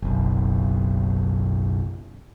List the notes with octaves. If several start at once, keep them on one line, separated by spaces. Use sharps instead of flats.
F#1 B1